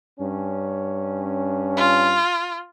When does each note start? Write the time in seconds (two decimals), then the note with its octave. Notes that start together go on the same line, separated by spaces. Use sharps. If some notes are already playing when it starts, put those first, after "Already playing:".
0.19 G2 C#4
1.77 F4